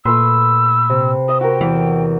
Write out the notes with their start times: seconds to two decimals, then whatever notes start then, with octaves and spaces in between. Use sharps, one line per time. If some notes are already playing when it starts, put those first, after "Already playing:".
0.05 A#2 A3 B4 C6 E6
0.90 C3
1.29 E5 D#6
1.41 F#4 A#4 G5
1.61 E2 E3